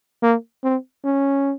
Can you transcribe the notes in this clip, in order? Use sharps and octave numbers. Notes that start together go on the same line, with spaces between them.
A#3
C4
C#4